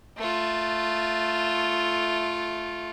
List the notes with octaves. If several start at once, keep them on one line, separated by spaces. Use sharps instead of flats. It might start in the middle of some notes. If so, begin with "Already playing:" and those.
A3 F4